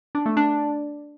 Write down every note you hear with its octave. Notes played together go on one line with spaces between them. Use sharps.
D4
A3
D4